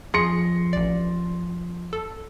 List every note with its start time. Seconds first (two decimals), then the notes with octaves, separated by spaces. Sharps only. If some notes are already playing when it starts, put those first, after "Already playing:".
0.14 F2 F3 G#4 C6 A#6 C#7
0.73 A1 D5
1.93 A4